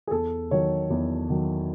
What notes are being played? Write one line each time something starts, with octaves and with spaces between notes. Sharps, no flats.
G#4
E2 A4
D#3 F#3 C#5
E2
D#3 F#3